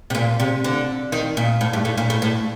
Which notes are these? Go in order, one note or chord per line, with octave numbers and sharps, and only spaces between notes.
C3
A#2
C3
D3
D#3
A#2
A2
G2
A2
A#2
A2
A2